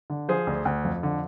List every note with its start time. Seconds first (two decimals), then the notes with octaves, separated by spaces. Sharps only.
0.10 D3
0.29 F3 G#4 C5
0.47 D2
0.65 D2
0.84 F2
1.03 D3